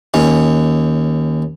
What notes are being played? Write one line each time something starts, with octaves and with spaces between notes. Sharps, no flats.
D#2 C#4